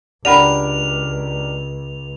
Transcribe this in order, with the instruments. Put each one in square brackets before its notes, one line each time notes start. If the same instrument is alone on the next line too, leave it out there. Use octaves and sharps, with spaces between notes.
[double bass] C#2 [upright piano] D4 G4 A#4 [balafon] D5 F#5 B5 [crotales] F7